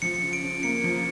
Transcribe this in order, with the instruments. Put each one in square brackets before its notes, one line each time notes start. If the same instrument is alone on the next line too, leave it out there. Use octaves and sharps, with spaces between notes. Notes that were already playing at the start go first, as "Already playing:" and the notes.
[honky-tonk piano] F3 [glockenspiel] C#7
[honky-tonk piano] C#3
[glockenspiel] D7
[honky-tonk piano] C#3
[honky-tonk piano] A#3 [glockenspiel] C#7
[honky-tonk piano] F3 [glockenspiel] C#7